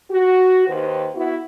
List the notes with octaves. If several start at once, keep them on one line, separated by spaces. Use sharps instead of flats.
F#4
D#2 D#3 B4 C5
B3 E4 F#4